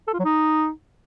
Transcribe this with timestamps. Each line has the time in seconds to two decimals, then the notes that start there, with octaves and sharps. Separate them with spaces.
0.08 A4
0.13 F4
0.19 F#3
0.25 D#4